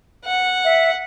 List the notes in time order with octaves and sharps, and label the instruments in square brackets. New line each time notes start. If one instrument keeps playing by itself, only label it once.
[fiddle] F#5
[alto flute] E5